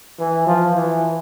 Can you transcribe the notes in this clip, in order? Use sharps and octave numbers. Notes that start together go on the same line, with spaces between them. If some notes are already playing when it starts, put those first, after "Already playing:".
E3
F3
E3